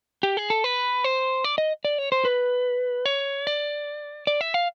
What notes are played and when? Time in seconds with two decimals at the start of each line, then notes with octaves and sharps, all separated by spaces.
0.23 G4
0.37 G#4
0.50 A4
0.64 B4
1.04 C5
1.44 D5
1.58 D#5
1.85 D5
1.98 C#5
2.12 C5
2.25 B4
3.06 C#5
3.47 D5
4.27 D5
4.41 E5
4.54 F5